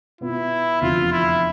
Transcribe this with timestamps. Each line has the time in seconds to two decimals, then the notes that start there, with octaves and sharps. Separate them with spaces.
0.20 B2 B3 E4 F4
0.81 F1 E2 D3 F3 F4
1.12 E4